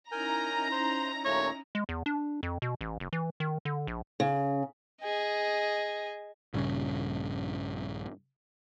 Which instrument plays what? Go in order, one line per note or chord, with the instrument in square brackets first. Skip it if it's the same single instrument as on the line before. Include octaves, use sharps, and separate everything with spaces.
[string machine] C#4 D#4 E4 [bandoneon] A#4 G#5 G6 [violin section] A#5
[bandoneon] C5 C6
[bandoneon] D#2 A#2 A3 [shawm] C#5
[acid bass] G#3
E2
D4
F2
B2
A1
F#1
E3
D#3
D3
A#1
[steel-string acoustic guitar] C#3
[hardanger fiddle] G#4 D#5
[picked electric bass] A#1 G2 C#3